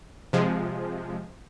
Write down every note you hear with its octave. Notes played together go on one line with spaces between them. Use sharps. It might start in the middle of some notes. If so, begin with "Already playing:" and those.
C3 F3 G#3